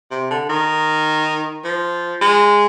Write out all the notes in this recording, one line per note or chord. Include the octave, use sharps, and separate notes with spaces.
C3
D3
D#3
F3
G#3